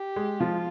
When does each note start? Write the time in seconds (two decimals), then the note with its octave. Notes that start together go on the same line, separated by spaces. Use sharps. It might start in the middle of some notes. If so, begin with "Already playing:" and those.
Already playing: G4
0.16 G#3
0.40 F3 F4